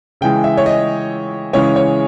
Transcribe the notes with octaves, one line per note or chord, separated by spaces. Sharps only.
C#3 E3 G#3 G5
E5
C#5
D#5
C#3 E3 G#3 C#4 C#5
C#5